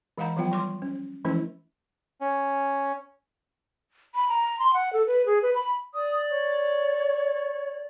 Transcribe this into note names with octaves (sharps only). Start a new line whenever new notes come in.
E3 G#3 F5 F#5 A#5 B5
F3 F#3 B3 F4 G5
G3 C6 D6
C#4
E3 F3 G#3 A3 C#4 E4
C#4
B5
A#5
C6
F#5
A4
B4
G#4
B4
B5
D5 D#6
C#5